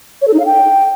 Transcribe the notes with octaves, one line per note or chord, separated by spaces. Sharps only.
C#5
A4
D#4
F5
G5